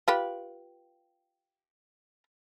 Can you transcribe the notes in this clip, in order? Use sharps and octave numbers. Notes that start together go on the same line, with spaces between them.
F4 G4 B4